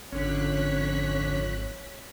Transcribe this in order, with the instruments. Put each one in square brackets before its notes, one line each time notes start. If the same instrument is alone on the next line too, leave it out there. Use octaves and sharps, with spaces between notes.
[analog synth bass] G#1 [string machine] F2 F#6 [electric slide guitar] D3 C#4 [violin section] C#5 B6